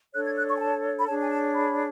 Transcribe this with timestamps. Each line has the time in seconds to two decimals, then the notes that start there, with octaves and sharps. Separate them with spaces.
0.13 D4 A4 C#5 F#6
0.25 G#6
0.38 F#6
0.49 C#6
0.57 G#5
0.60 A5
0.98 B5
1.07 D4 G#4 C#5 A5
1.21 G#5
1.31 A5
1.54 B5